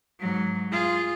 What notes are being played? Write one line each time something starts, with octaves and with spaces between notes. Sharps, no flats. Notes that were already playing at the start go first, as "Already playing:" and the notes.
G#2 F#3
F4 G#4